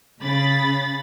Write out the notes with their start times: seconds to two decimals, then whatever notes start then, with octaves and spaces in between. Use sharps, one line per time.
0.22 C#3 B5 A6